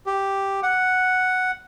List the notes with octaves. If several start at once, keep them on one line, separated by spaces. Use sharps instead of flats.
G4
F#5